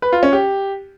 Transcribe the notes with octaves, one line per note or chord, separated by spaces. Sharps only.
B4
F4
C#4
G4